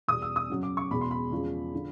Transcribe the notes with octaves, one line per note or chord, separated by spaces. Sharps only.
E2 B2 G3 D#6
E6
D#6
F#2 C#3 F#3
D6
C#6
E2 B2 G#3 B5
C6
B5
E2 C#3 F3 G#3
D3 F3